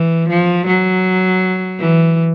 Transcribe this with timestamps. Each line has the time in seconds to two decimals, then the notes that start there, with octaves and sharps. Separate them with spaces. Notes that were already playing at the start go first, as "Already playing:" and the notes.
Already playing: E3
0.29 F3
0.67 F#3
1.79 E3